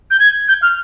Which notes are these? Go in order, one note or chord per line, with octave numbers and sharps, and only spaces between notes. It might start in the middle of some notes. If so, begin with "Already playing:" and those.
G6
G#6
G6
F6